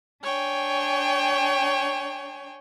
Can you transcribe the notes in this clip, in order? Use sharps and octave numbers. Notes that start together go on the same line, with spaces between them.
D4 C#5 G5 G#5